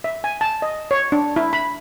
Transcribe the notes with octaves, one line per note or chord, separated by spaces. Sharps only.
E5
G#5
A5
D#5
C#5
D4
E4
B5